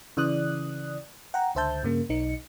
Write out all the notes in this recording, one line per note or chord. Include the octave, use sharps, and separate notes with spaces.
C#3 E3 D5 D#6 F#6
F#5 G5 A#5
C#2 D3 C5 E5 A5 G6
G2 C#3 A#3
B1 D#4 C#7